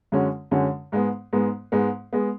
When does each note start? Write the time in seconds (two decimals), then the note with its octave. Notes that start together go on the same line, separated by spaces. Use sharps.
0.12 F#2 D3 G#3 C#4 F#4
0.51 F#2 D3 G#3 C#4 F#4
0.92 G#2 G#3 B3
1.33 G#2 G#3 B3
1.72 G#2 G#3 B3
2.13 G#3 B3